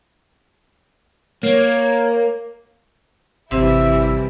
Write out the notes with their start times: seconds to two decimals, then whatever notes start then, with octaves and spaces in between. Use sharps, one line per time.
1.43 A#3 C#5
3.51 G#1 C3 E3 G3 E4 E5